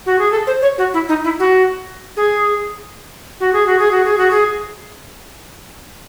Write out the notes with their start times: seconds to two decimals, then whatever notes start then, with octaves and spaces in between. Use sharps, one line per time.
0.06 F#4
0.19 G#4
0.31 A4
0.47 C5
0.62 C#5
0.78 F#4
0.94 E4
1.09 D#4
1.24 E4
1.39 F#4
2.17 G#4
3.40 F#4
3.53 G#4
3.66 F#4
3.79 G#4
3.91 F#4
4.05 G#4
4.18 F#4
4.31 G#4